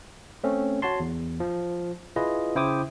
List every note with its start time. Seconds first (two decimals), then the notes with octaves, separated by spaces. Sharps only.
0.44 A3 C4 C#4
0.82 F#4 C#5 A5 C6
1.00 E2
1.40 F3
2.16 E4 F4 G#4 B4 D#5
2.55 C#3 E4 C5 G5 D6 D#6